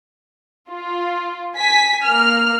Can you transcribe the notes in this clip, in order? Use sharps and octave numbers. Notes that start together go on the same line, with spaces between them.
F4
G#5 B6
A#3 F6